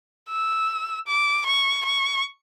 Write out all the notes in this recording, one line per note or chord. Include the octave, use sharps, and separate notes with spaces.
E6
D6
C#6
C#6